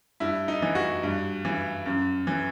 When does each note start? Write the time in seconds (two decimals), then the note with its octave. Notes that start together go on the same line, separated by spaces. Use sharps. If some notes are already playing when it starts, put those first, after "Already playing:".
0.20 G2 E4
0.48 D#4
0.62 E3
0.75 F#4
1.03 G2
1.45 E3
1.86 F#2
2.27 E3